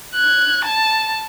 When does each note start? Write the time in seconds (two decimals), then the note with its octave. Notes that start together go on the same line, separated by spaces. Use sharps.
0.15 F#6 G#6
0.65 A5